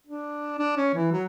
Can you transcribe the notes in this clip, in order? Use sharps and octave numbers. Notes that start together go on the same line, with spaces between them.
D4
D4
C#4
E3
F#3